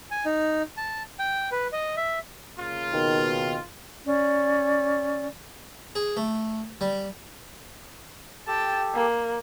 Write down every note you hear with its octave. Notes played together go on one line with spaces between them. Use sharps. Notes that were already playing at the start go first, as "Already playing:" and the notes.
G#5
D#4
A5
G5
B4
D#5
E5
C#3 A#3 F4
B2 D#3
C#4 D5
G#4
A3
G3
G4 A4 G5 A5
A#3